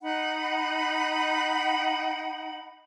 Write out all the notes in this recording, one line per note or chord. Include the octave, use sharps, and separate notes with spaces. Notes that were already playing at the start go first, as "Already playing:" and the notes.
D#4 F#5 B5